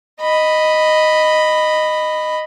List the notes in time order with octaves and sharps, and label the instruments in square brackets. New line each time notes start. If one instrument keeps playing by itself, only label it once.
[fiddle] D#5 B5